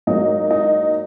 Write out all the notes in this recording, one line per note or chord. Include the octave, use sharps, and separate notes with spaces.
G#2 F#3 A#3 D#4
D#4